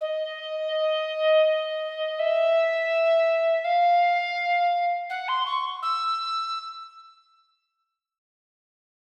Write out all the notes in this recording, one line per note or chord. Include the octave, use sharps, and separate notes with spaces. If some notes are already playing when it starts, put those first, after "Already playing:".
D#5
E5
F5
F#5
C6
C#6
E6